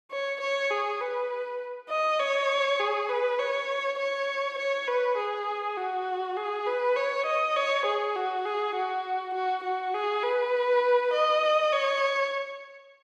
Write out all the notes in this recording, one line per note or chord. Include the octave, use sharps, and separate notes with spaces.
C#5
C#5
G#4
B4
D#5
C#5
G#4
B4
C#5
C#5
C#5
B4
G#4
F#4
G#4
B4
C#5
D#5
C#5
G#4
F#4
G#4
F#4
F#4
F#4
G#4
B4
D#5
C#5